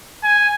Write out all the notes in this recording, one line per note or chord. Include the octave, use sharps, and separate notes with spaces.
G#5